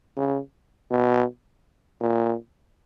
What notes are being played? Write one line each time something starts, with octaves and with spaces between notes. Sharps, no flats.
C#3
B2
A#2